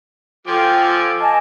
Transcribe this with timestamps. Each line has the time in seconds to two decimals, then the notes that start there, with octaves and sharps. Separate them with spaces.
0.47 F3 F4 A4 G5 G#5 C6 D6
1.20 D#5 G#5 A5